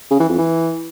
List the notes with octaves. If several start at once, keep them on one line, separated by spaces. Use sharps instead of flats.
C#3
E3
F2
E3